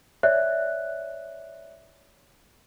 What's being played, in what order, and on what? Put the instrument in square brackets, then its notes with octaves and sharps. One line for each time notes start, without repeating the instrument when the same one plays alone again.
[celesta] C#5 D5 E5 F#6